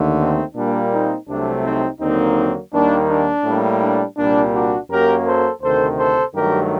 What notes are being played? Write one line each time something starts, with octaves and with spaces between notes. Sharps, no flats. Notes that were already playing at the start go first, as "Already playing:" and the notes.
Already playing: D#2 D3 A3
C4 D#4
A#2 G3 A#3 D4
C4 D#4
C2 C3 F#3 A3 D4
C4 D#4
D#2 D3 F#3 A#3 C4 D#4
D#2 D#3 G3 A#3 D4
D4
A2 G3 A#3
D4
C2 A#2 G3 A#3 D4
D4 F#4
F#2 F#3 A#3 G4 A#4
A4 C5
D2 C3 D#3 A4 C5
A4 C5
G2 D#3 F#3 A3 G4 A#4